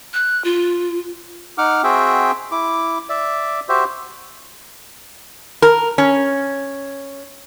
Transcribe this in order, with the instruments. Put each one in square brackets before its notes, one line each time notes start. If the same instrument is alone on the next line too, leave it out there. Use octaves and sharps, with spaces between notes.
[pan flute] F#6
F4
[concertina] D#4 F#5 D6 F6
C4 F#4 G#4 E5 G5
E4 D6
D5 E5
F#4 G4 C5 E5
[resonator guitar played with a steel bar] A#4
C#4